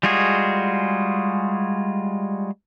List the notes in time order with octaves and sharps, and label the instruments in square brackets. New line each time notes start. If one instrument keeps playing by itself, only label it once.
[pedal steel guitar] G3 G#3 F4 F#4 G#4